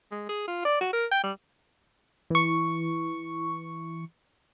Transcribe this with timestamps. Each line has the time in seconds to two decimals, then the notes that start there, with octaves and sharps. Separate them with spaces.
0.12 G#3
0.29 G#4
0.48 F4
0.65 D5
0.81 F#4
0.93 A#4
1.12 G5
1.23 G3
2.30 E3 C#6